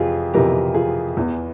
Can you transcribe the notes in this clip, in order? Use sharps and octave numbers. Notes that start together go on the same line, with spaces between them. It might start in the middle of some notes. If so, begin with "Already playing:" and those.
Already playing: F2 C3 E3 F4 G4 G#4
F2 C3 E3 G4 A#4
F4 G#4
E2 E3